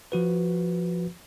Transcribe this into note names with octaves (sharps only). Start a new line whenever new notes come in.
F3 F#4 B4